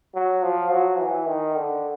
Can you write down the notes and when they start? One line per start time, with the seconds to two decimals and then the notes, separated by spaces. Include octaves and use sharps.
0.14 F#3
0.43 F3
0.71 F#3
0.99 E3
1.28 D#3
1.56 D3